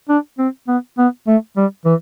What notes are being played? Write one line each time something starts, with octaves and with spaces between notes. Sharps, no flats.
D4
C4
B3
B3
A3
G3
E3